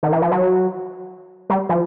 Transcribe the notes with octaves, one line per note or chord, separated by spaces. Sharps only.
D#3
E3
F3
F#3
G3
F3